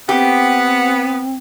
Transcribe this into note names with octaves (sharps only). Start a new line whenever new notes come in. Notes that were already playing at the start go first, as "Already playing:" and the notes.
B3 C4 G4 F#5